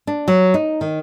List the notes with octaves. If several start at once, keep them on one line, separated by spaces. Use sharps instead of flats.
D4
F#3
D#4
D#3